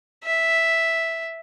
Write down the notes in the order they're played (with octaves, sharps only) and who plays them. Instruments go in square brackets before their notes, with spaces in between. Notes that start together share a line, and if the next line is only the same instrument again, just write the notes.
[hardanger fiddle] E5